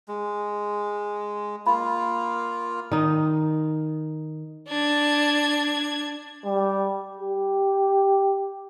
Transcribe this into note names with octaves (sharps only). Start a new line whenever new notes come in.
G#3
A#3 F4 B5
D#3 D#4
D4 G#6
G3
G4